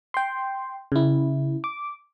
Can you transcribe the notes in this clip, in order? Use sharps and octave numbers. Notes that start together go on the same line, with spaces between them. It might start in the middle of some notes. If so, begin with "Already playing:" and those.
G5 C6
C#3 E4
D6